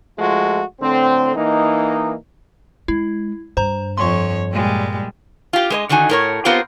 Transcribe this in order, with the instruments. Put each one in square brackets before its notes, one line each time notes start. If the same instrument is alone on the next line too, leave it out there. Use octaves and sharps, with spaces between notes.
[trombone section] F3 G#3 A3 F4 F#4
A2 D3 C4
E3 A#3 D#4
[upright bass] G#3 [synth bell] E4
[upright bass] G2 [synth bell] C5 A#5
[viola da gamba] F2 C#5 [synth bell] C6 C#6
[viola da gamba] A#2 G3 G#3
[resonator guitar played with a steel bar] F4 G4
G#3 B4 D#5
D3 D#3 D#4 F#4 G#5
A2 A#4 C#5
B3 C4 F4 G4 A#4 C5